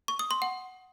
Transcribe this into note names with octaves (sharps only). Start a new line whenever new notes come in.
C#6
D#6
C6
F#5